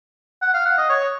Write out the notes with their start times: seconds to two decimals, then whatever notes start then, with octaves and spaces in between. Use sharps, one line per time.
0.42 F#5
0.54 F5
0.66 F#5
0.78 D#5
0.89 C#5